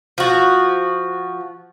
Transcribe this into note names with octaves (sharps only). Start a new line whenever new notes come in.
F3 F#4